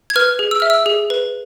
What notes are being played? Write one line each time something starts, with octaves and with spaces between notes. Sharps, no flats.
G#6
B4 F6
G#4
E6
E5 F6
E6
G#4
B4